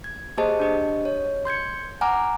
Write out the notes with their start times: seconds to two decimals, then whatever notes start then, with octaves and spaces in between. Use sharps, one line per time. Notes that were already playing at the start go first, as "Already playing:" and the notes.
0.04 G#6
0.37 A#3 G4 G#4 C5 D#5 A5
0.60 D4 G4 D#5
1.05 C#5
1.45 C6 G6 G#6 C#7
2.01 F#5 G#5 A#5 D6 F6